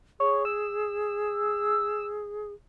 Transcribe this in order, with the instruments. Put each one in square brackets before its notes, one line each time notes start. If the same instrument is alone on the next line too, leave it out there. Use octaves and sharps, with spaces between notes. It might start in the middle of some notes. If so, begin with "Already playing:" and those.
[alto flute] G#4 [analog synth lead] C#5
[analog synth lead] E6